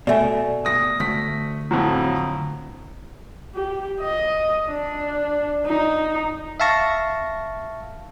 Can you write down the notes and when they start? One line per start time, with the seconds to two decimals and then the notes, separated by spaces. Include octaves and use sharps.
0.07 B2 A3 D5 E5 G#5
0.65 D#6 A#6
1.00 D2 A3 B6
1.71 F2 A2 F#3
3.55 G4
4.01 D#5
4.68 D4
5.65 D#4
6.60 E5 F5 A5 C#6 A#6